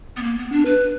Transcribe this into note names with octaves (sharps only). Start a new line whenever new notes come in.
B3
A#3
B3
D4
B4